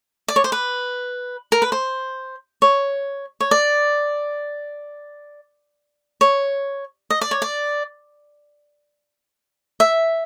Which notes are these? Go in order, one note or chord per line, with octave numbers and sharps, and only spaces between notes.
D5
C#5
C5
B4
A#4
B4
C5
C#5
C#5
D5
C#5
D#5
D5
C#5
D5
E5